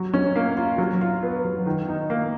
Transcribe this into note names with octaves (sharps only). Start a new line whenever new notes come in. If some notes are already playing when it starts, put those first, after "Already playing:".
Already playing: F#3
C#4
A#3
F4
F#3
F4
B3
F#3
D#3
D#4
A#3